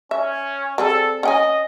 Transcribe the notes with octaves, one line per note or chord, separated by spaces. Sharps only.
C#4 E5
G3 C4 G#4 A4
C#4 D#5 G5 G#5